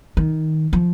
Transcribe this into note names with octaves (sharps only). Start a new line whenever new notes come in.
D#3
F3